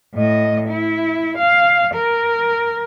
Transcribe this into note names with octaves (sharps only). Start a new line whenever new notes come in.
A2 D#5
E4
F5
A#4